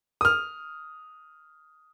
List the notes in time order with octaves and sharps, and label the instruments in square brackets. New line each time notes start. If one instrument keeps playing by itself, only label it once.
[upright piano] D#6 F6